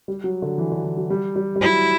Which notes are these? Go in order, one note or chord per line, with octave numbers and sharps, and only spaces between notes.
G3
F#3
D3
E3
D3
E3
F#3
G3
G3
G3
F#3 E4